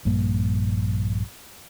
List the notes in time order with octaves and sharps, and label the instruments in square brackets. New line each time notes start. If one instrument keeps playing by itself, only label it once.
[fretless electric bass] A#1 G2 G3 A#3